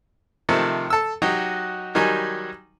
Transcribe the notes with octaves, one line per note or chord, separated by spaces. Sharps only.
C3 D#3 F3 A3
A4 E6
F#3 D#4 F#4 G4 D#5
D#3 F#3 G3 D#4 G#5